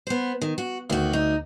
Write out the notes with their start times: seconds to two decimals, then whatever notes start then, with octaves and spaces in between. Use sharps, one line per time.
0.07 B3 C5
0.41 D#3
0.58 F#4
0.90 D2 D#3 F#4
1.13 D#4